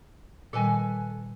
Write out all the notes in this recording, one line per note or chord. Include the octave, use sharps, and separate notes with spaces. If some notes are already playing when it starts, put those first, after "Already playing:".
A#2 D#3 G3 A4 B4 G#5